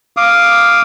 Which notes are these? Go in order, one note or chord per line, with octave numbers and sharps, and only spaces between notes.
F5 D6 D#6